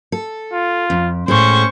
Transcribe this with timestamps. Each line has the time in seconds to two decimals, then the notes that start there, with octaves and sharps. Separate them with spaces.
0.12 A4
0.53 F4
0.90 F2
1.28 A2 G#3 C#4 C5 C#6